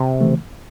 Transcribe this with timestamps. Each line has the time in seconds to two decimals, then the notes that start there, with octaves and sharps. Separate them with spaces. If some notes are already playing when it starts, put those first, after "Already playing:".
Already playing: C3
0.21 C#3 E3 A3